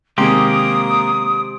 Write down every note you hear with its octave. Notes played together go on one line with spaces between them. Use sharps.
C3 D#3 G#3 A#3 G4 C6 D#6 D7